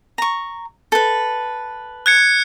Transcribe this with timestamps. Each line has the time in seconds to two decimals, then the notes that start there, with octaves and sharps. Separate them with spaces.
0.18 A#5 C#6
0.92 A4 B4
2.06 F#6 G#6 C#7